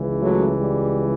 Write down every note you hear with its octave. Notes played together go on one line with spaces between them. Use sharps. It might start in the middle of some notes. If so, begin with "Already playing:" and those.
Already playing: C#2 C#3 E3
F#3 A3
G3